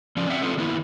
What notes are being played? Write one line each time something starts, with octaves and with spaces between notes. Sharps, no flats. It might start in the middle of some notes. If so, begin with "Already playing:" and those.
F3 C#4 D5
C4 E5 F#5
A3 B3 C4 F4 A4
D#3 A#3 B3 E4